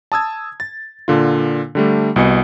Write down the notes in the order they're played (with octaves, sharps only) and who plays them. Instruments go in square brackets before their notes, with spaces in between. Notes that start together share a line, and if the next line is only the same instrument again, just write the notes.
[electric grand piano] A5 D#6 E6 G#6
A6
A#2 D3 F4
D3 G3 A3
C2 B3 F#4 D#5 G#5 C#7